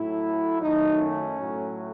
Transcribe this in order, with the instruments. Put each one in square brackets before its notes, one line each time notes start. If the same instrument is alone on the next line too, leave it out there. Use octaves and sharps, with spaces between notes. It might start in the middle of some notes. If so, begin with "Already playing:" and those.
Already playing: [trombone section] A2 F#3 A3 E4
F#2 D#3 F#3 A3 D#4
C#4
A2 F#3 A3